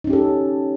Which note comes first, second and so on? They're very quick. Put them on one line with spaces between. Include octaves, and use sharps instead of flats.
D#4 C#4 G4 A4